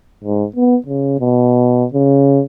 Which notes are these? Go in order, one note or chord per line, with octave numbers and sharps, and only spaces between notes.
G#2
B3
C#3
B2
C#3